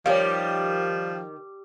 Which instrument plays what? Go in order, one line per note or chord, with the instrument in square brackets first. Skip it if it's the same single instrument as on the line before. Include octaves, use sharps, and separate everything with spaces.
[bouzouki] D#3 G4 [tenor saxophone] F3 [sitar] G3 [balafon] C#5 F5